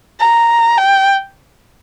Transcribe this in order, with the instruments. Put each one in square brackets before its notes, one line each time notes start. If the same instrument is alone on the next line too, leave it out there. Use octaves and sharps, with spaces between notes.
[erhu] A#5
G5